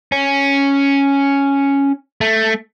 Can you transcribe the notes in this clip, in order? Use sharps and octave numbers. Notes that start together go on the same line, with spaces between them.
C#4
A3